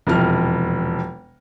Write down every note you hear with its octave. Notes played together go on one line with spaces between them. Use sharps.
E1 F2 C3 F6